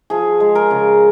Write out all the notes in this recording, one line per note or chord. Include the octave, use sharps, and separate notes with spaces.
F3 G#4
G#3
A#4
C#3